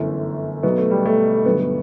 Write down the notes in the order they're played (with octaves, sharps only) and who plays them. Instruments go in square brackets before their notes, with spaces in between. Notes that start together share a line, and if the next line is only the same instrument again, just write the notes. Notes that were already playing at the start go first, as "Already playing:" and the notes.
Already playing: [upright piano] G1 F#2 E3 A3
B1 B2 F#3 B3
A3
G3
A3
G1 G2 F#3 B3